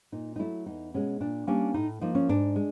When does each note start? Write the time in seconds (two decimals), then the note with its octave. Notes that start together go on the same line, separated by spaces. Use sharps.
0.12 A#2 D#4
0.36 D#4
0.39 F#3 A3 E4
0.66 E2 D#4
0.94 B2 G#3 C#4
1.20 A#2 D4
1.47 G3 A#3 C#4 D4
1.74 A2 D#4
2.01 F3 A#3 D#4
2.15 C#4
2.29 G#2 D4
2.56 G#3